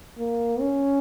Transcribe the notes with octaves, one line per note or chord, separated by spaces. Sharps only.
A#3
C#4